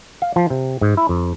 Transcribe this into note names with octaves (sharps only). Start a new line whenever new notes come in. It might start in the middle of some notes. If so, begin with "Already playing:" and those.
F5
F3
C3
G#2
E4
F2